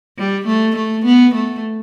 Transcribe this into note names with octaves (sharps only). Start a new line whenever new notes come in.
G3
A3
A3
B3
A3